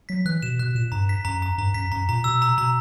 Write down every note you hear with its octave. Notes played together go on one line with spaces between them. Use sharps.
F#3 B6
E3 F#6
B2 E7
B2 F#6
A#2 E7
G2 A#5
B6
F#2 A#5
A#5
G2 A#5
F#2 B6
F#2 A#5
A#2 A#5
B2 E6
A#5
B2 A#5